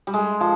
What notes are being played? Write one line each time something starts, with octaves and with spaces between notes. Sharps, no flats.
G3
G#3
F3